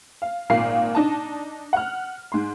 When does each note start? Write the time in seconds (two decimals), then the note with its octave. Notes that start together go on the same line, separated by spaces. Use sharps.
0.22 F5
0.50 G#1 A#2 A#3 F4 C7
0.95 D4 D#4 A5
1.73 F#5 F6
2.32 G#2 C6